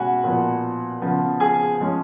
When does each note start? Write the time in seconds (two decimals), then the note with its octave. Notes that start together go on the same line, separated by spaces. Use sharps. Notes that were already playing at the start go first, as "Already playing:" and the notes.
Already playing: B2 G#3 C#4 F#4 F#5 G#5 B5
0.24 A#2 F3 B3
1.01 C#3 F3 B3
1.40 G#4 G#5
1.80 F3 G#3 C#4